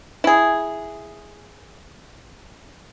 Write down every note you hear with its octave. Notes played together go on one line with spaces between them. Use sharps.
E4 G#4